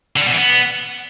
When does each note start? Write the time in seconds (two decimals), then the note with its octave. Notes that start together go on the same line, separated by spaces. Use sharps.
0.16 D3
0.21 G3
0.26 B2
0.31 E3
0.37 B3